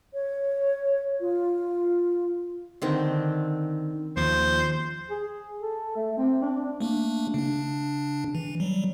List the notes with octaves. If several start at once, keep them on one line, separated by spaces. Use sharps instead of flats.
C#5
F4
D3 D#3 C4
D#2 F3 C5
G#4
A4
A3
C4
D4
A3 A#3 D4
C#3 D4
E3
F#3 G3